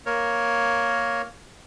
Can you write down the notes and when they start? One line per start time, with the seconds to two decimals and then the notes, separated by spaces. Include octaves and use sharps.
0.06 A#3 A#4 C#5